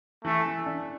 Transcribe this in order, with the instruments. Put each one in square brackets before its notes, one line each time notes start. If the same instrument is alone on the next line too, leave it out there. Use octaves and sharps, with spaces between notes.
[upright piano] E3 [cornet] A3
[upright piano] E3
D4